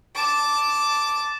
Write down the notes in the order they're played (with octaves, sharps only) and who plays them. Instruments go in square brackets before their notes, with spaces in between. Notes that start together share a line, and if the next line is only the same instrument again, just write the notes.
[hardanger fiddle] A5 D6